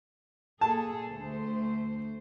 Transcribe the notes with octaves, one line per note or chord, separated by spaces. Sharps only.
A#2 G#4 A4 A5
D2 A3 C5